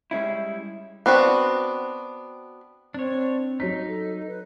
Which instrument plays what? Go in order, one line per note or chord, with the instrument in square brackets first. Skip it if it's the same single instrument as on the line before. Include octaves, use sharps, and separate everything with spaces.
[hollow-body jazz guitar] G3 G#3 C#4 E4
[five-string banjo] B3 C4 D4 F#4
[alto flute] C4 [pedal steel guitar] D4 C#5
[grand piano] F#3 C#5 B6 [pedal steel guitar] D#4
[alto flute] A4
B4